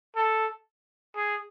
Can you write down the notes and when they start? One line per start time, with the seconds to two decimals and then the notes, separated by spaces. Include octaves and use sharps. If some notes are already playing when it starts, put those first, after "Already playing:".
0.16 A4
1.15 G#4